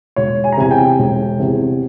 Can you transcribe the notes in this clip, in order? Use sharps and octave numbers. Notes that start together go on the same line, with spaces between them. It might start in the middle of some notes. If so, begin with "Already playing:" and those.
E1 C#5
G#5
A#5
E2 C3 G#5
G5
E1
E2 C3